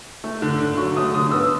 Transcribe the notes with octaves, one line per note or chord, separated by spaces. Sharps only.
A3
D3
D3
F#3 C#6
A3 D#6
D3 D#6
B3 E6